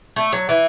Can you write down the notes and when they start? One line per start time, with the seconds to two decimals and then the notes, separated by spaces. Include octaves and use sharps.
0.16 A3
0.33 F#3
0.49 E3